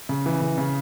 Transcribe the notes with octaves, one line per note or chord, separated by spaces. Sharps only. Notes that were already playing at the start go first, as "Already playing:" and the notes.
C#3
E3
C#3
C#3